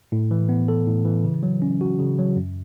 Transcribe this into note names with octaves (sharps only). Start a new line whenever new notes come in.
A2
E3
B3
A4
A2
E3
C#3
F#3
C#4
F#4
C#3
F#3
F#2